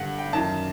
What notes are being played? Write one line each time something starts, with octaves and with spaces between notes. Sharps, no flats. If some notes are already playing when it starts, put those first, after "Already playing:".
Already playing: G2 D3 F#5
G5
F#2 D#3 A5